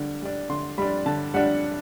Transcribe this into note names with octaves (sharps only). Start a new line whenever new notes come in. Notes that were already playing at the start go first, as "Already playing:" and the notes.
Already playing: D3 G3 D4
G3 D4
D3 C6
G3 D4 B5
D3 A5
G3 D4 F#5